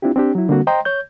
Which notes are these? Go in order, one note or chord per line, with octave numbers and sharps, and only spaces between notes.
C4 D4 E4 F4 G4
C4 D4 G4
F#3 E4
D3 G3 A#3 C4 F#4
C5 D#5 G5 A#5 C6
C#5 G6